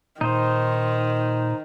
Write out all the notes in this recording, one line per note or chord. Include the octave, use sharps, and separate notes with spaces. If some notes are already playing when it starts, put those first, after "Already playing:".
A#2 D#3 D#4 C5